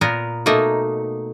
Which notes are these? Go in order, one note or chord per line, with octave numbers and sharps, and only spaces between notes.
A#2 B3 A#4
B2 A3 A#3 D#4